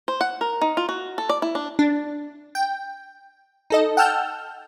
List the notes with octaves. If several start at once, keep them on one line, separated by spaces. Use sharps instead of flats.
C5
F#5
A#4
D#4
F4
F#4
A4
D5
E4
D4
D4
G5
D#4 A4 D#5
F#5 G5 A5 E6 F6 G6